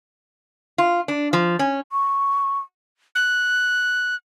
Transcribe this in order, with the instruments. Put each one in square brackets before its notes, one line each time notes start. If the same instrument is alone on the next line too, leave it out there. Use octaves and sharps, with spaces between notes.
[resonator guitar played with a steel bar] F4
D4
F3
C#4
[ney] C#6
[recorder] F#6